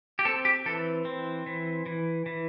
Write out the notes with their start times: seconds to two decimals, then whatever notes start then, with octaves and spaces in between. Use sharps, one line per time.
0.19 G4
0.25 C4 A4
0.45 G4
0.66 E3 A4
1.05 C4
1.46 E3
1.86 E3
2.26 E3